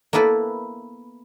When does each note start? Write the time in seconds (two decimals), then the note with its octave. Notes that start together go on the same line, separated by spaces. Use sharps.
0.13 A#3 B3 E4 A4 B4